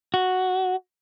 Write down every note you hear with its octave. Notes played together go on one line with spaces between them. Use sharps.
F#4